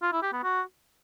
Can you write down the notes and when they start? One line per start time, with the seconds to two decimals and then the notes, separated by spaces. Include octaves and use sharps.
0.02 F4
0.12 E4
0.23 G4
0.33 B3
0.43 F#4